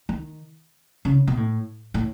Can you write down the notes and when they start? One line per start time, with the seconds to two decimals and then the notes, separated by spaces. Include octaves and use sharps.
0.09 D#3
1.05 C#3
1.27 B2
1.37 A2
1.94 A2